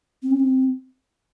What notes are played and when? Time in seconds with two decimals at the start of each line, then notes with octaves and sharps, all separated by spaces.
0.23 C4
0.31 C#4
0.40 C4